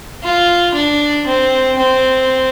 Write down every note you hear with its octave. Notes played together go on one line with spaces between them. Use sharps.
F4
D4
C4
C4